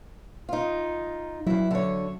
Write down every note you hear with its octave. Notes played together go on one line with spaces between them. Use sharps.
D#4 F4
G2 F#3 E4
D3 C#5